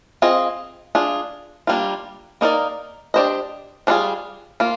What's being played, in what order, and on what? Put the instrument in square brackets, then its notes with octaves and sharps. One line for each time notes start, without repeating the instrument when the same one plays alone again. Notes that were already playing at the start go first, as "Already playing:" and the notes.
[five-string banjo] C4 F4 G#4 D#5
D4 F4 G#4
G3 A#3 D4 F4
A#3 D#4 A#4 D5
D4 G4 C5 D#5
G3 D4 F4 G#4
A#3 F4